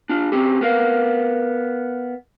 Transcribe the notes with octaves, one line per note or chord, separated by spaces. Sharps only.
D4 F4
C4 C#4 G4
B3 A#4 F5